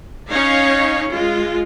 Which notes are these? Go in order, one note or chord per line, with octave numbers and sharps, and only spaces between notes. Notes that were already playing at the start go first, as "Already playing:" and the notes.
C#4 D#4 C#5 F5
G#3 F4